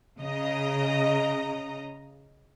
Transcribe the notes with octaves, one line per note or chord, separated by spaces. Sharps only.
C#3 D#5 A#5